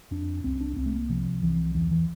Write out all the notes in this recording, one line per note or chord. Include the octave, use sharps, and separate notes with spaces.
F2 D4
C2 C4
D4
C2 C4
A3
A#3
C3 F3
C2 E3
E2 E3
E3